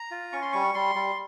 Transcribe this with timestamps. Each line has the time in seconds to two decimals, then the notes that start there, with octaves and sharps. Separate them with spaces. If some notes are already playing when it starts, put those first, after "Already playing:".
Already playing: A#5
0.11 F4
0.32 C#4 C#6
0.42 C6
0.52 G3 C#6
0.74 G3 C6
0.95 G3